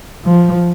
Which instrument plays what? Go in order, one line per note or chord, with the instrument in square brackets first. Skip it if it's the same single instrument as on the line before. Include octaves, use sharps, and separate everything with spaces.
[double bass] F3